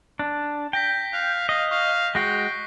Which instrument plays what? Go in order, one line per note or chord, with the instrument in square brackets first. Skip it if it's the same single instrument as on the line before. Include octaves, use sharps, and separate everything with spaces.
[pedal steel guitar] D4
[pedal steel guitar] G5 [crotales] G6 A#6 B6
[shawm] F5 [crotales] F#6
[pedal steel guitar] D#5 [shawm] F5
[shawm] F5 [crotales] C#6
[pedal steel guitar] G#3 F#4 [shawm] G5 [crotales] A#6 C7